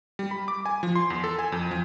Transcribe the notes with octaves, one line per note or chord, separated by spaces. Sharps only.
G3
B5
D6
G#5
F3
C6
E2
A4
G#5
F2
F3